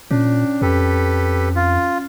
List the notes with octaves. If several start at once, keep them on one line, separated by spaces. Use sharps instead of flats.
A#2 C#4 D4
F2 G4 A4 B4
F4